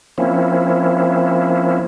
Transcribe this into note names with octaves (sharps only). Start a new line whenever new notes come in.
F3 A#3 C4 C#4 E4